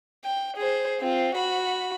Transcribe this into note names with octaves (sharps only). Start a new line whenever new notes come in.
G5
G#4 C5
C4 F4
F#4 B5